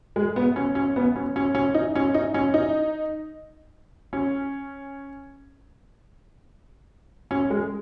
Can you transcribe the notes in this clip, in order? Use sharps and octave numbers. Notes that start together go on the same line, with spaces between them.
G#3
B3
C#4
C#4
B3
C#4
C#4
C#4
D#4
C#4
D#4
C#4
D#4
C#4
C#4
G#3